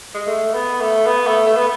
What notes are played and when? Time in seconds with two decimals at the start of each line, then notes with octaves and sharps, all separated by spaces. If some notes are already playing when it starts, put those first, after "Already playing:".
0.15 G#3
0.27 A3
0.54 B3
0.81 A3
1.06 B3
1.27 A3
1.46 A3
1.57 B3